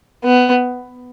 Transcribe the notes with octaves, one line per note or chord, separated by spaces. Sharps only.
B3